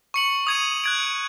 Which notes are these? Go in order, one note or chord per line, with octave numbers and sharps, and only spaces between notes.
C#6 C#7 F#7
D#6 G#6 D#7
F#6 G#6 D7